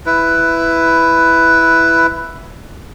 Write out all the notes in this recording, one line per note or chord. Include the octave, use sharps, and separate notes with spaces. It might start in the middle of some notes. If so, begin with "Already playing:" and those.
E4 B4